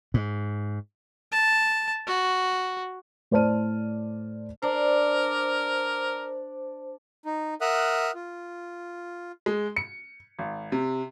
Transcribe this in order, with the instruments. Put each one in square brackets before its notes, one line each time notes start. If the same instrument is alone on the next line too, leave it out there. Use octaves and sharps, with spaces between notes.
[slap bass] G#2
[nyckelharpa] A5
F#4
[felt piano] A2 C5 D5 A5 F6 D#7
[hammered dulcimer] D4 D5 [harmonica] A#4 [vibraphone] C5
[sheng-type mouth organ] D#4
A#4 E5 F#5 D#6 F6 F#6
F4
[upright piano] G#3
C#7
G#1
C3